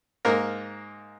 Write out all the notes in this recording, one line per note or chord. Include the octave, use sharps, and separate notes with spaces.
G#2 A#3 A#4